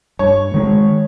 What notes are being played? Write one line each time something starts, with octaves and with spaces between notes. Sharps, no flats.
G2 C#5
D#3 G#3